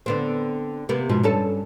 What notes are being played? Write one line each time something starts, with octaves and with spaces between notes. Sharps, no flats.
D3 B3 C4
C3 A#3 B3
G#2 B2 F3
G2 C#4 A4